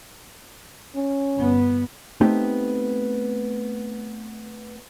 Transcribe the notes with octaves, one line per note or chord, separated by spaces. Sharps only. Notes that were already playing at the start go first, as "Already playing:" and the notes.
C#4
G1 B3
A3 B3 C4 D#4 G4